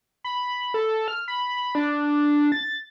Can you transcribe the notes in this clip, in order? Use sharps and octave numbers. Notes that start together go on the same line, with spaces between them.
B5
A4
F6
B5
D4
A6